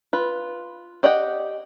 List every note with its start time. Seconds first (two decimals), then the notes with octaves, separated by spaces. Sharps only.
0.13 F4 B4
1.03 G4 D5 D#5 F#5 G5